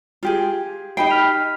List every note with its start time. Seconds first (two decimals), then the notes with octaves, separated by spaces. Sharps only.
0.23 F4 G4 G#4
0.97 D#4 G4 G5 B5 C7
1.10 F6 B6 F7